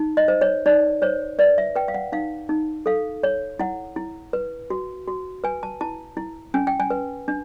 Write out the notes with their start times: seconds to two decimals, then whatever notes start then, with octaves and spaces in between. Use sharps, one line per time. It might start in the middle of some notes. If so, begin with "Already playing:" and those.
Already playing: D#4
0.17 D#5
0.28 C5
0.41 C#5
0.66 D#4 D5
1.02 C5 C#5
1.39 B4 D5
1.58 E5
1.75 B4 G5
1.88 F5
1.94 F#5
2.12 D#4 F5
2.49 D#4
2.86 A4 F5
3.23 C#5
3.59 E4 F#5
3.96 E4
4.33 B4
4.70 F#4
5.08 F#4
5.44 B4 G#5
5.63 A5
5.81 E4 A5
6.17 E4
6.54 C#4 G#5
6.67 G5
6.80 G#5
6.90 B4
7.28 D4